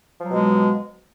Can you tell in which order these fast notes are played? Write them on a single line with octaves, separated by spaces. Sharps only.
F3 F#3 B2 G#3